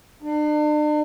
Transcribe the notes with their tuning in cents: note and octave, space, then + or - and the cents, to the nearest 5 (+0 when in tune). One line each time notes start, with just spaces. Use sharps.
D4 +40